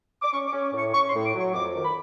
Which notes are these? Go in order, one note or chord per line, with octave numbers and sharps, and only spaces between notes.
D6
C#4 C#6
D6
C#4
C#6
A2
C#6
C#4 C#6
C6
A2
D6
F#3
C#6
F2 D6
D#3
B5